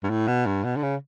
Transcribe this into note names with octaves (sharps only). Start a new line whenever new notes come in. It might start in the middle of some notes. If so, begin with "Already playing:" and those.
G2
A2
B2
G2
B2
D3
C#3